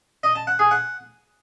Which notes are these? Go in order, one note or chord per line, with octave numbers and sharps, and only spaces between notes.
D#5
A5
F#5
G#4
F#5